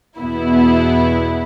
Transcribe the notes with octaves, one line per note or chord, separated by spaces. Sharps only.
E2 B2 B3 E4